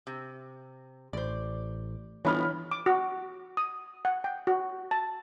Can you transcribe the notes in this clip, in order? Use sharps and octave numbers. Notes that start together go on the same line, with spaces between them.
C3
A1 C5 D5
G1 B2 E3 F3 B3 C#5 B5 F6
D6
F#4
D#6
F#5
G5
F#4
A5